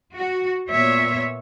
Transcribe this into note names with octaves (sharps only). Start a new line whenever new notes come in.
F#4
A#2 B3 C#5 E5